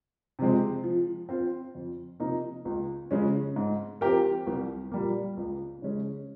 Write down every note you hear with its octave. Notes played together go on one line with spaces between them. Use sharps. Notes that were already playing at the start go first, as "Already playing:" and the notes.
C3 F3 G#3 C4
F3
C4 F4 C5
F2
C3 F3 A#3 D#4
C#2
C#3 F3 G#3 C#4
G#2
F3 C4 G4 A#4
C2
A#2 G3 A#3
C#2
C#3 G#3 C#4